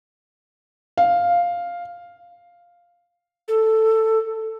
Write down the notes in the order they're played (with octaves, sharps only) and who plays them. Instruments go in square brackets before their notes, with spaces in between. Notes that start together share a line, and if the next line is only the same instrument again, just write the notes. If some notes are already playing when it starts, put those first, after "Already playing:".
[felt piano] F5
[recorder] A4